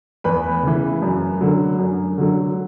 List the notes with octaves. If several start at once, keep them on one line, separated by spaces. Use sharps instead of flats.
E2 B4 B5
C#3 E3
F#2
D3 F#3
F#2
D3 F#3